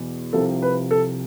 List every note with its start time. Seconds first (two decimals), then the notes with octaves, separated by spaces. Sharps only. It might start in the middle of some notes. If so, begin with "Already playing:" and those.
Already playing: E2 B2
0.33 C2 C3 F3 A4
0.62 B4
0.91 A4